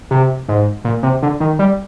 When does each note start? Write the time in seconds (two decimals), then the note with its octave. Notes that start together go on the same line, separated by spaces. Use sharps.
0.11 C3
0.49 G#2
0.85 A#2
1.03 C3
1.22 D3
1.40 D#3
1.59 G3